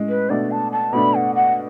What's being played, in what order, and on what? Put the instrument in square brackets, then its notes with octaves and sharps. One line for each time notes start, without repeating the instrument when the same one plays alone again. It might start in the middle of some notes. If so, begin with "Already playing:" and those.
Already playing: [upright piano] A2 G#3 C#4
[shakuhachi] B4
[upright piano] B2 A3 D4 [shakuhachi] D5
[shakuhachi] A5
A5
[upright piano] B2 A3 D4 [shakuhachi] B5
[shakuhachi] F#5
F#5